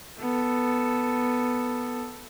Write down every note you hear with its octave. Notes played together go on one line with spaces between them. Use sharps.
B3 A4